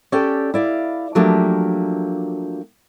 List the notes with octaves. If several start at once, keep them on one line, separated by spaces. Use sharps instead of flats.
C#4 G4 A4 D5 G5
E4 D5 F5
F3 F#3 A3 A#3 D4 G4